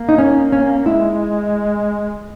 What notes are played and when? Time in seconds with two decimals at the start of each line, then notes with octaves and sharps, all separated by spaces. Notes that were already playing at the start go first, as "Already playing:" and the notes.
Already playing: A#3
0.09 D#4
0.18 C#4
0.52 C#4
0.86 G#3 E4